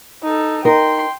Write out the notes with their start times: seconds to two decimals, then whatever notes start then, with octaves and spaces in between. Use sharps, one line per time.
0.23 D#4 A4
0.65 D#4 A#4 G5 C6